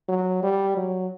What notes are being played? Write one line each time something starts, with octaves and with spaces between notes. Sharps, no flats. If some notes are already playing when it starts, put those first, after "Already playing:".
F#3
G3
F#3